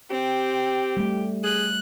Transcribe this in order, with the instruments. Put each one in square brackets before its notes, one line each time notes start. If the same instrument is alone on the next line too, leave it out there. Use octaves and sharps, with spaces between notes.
[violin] C4 [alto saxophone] G4
[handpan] G3 A3
[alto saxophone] G#4 [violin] F#6